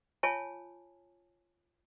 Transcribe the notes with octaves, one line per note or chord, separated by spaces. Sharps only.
F4 C#5 G#5 A5